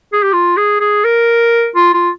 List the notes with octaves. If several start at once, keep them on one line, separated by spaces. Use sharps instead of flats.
G#4
G4
F4
G#4
G#4
A#4
F4
F4